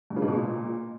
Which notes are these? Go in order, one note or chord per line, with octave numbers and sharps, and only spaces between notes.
G2
C#3
G#2
B2
A#2